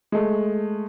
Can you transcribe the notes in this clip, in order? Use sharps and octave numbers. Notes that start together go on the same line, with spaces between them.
G#3 A3